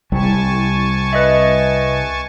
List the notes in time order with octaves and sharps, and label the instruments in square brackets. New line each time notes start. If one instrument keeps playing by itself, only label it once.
[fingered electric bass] C2 G3 [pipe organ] G#5 A5 C#6
[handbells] B4 D#5 E5